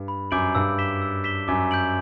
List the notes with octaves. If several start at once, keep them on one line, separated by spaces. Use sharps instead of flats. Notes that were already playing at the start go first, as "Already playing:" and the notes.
Already playing: G2
B5
F#2 D6 G6 D7 F#7
G2 E6
B6 E7 G7
E6
B6 E7 G7
F#2 D6
G6 D7 F#7